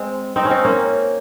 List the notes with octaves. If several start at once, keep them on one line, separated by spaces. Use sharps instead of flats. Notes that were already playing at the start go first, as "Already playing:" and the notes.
Already playing: G#3 C4
C4 D#4
C#4
C4 D#4
A#3 C#4